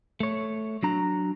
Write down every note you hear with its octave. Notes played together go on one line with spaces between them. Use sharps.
A3 C#5
F#3 D4 A#5